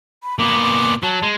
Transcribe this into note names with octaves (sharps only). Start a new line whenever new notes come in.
B5
A#2 B3 D6
F#3 A5
G#3